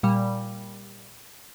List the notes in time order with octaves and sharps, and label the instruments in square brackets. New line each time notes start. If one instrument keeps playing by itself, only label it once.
[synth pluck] A#2 G3